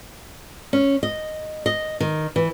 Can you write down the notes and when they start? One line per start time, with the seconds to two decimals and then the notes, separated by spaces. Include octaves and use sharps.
0.73 C#4
1.03 D#5
1.66 D#5
2.00 D#3
2.36 E3